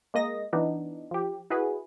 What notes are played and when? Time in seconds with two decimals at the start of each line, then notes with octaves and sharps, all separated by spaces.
0.14 G#3 A#3 D#5 A#6
0.53 E3 B3 D4 D#4
1.11 F3 G4
1.50 E4 F#4 G#4 B4